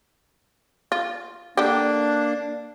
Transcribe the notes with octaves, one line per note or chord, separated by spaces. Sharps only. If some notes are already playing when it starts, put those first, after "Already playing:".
F4
D3 A#3 D4 G4